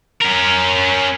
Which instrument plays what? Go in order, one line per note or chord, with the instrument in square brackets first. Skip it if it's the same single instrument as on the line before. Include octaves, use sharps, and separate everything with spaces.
[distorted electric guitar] C#4 A#4